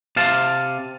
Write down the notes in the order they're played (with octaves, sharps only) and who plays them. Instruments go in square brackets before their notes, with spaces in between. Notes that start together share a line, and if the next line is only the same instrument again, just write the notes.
[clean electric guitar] C3 F5 A5